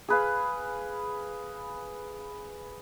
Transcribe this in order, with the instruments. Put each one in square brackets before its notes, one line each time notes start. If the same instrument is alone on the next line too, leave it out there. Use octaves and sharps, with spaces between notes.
[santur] G#4 B4 F5